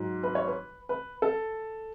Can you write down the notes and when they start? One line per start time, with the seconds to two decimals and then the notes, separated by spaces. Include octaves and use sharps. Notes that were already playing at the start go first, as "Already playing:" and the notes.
Already playing: G#2 F#3
0.23 B4
0.35 C#5
0.48 B4
0.89 B4
1.22 A4